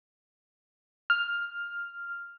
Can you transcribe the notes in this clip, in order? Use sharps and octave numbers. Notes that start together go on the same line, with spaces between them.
F6